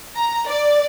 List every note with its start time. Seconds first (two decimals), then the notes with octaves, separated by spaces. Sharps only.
0.16 A#5
0.48 D5